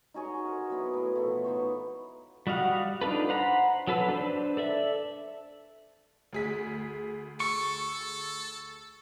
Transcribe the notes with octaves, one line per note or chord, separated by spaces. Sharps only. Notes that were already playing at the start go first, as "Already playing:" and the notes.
D#4 F#4 G#4 C#5
A#4 C5
F#3 B3 E4
A2 E4
B2 E3 F3 A3
B3 D#4 C5 C#5
G3 F#4 D#5 F5 F#5
D4 D#4 F4 A4 B4
C5 F#5 A#5 B5
F#3 A4 B4 E6
D4 B4 C5
A4 D5 E5
D2 G#4 B6
A4 C#6